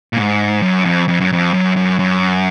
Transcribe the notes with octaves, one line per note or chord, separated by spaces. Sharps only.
A#2
G#2
F#2
F2
F2
F#2
F2
F#2
F#2
F#2